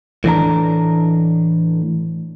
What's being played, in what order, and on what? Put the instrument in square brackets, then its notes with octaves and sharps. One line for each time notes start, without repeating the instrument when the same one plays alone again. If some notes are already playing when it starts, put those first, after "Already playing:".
[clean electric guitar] A2 E3 D4 A#5